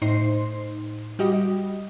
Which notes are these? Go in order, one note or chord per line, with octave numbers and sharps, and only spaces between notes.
A2 D#4 C5 C6 C7
G3 F#4 G4 D#5